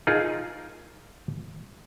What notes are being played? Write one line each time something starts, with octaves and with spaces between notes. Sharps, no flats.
D#4 F4 G#4 A#4